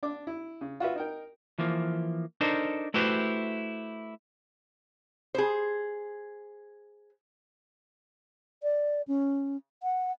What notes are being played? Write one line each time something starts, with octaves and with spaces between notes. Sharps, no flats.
D4 D6
E4
C#3
F4 F#4 B4 E5
D#4 A#4 G5
E3 F3 A#3
D4 D#4 A4 A#4 C5
A3 E4 F#4 G4 B4 C5
G#4 C5
D5
C#4
F#5